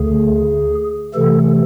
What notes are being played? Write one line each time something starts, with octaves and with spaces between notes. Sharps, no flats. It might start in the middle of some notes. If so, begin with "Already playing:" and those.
Already playing: D2 D3 A3 G#4
C3 E3 A3 A4